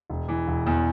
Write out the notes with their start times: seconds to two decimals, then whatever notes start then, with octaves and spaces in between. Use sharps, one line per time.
0.10 E1
0.28 E3
0.48 E1
0.67 E2